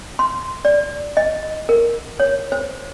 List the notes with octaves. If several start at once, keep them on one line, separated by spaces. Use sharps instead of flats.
C6
D5
D#5
A#4
C#5
C5